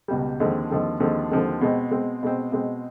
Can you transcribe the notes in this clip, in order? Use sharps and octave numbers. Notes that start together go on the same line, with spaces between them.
C#2 B2 G3
D#2 D3 F3 G#3 C4
D#2 D3 F3 G#3 C4
D#2 D3 F3 G#3 C4
D#2 D3 F3 G#3 C4
B2 G#3 C4
B2 G#3 C4
B2 G#3 C4
B2 G#3 C4